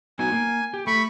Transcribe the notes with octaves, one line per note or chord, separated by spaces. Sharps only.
B3 D#4 F#4 G#5
A#3
G4
A3 B5 C#6